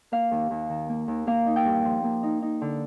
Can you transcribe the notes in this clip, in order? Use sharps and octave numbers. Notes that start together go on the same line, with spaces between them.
A#3 F5
D#2
D#2
D#3
A#3
D#2
A#3 F5
D#4
G5
G2
F3
A#3
D#4
D#4
D3